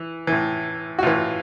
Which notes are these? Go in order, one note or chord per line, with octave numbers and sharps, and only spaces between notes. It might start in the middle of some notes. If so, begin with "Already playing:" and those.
Already playing: E3
A2 E3
F#4
A2 E3 F4